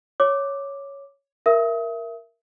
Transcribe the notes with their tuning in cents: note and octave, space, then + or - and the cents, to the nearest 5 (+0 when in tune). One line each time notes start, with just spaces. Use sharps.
C#5 +0 D6 +0
A#4 +0 E5 +20 D#6 +30